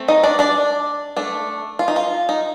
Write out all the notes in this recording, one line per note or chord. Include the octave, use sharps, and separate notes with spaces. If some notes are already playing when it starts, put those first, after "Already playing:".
Already playing: A3 C4
D#4 D#5
D4 D5
D4 D5
A3 D4
F4
D#4
F4
D#4